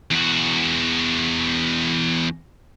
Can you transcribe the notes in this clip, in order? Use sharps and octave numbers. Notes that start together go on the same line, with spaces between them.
E2 F#4